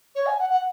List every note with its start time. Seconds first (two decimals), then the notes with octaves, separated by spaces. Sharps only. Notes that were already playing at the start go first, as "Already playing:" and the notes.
0.15 C#5
0.26 G#5
0.39 F#5
0.50 F#5